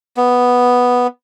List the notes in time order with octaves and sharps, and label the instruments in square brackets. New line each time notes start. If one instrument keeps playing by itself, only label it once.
[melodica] B3